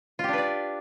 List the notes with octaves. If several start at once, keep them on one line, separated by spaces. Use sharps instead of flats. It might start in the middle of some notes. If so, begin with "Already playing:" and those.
D4 F4 G4 B4 D5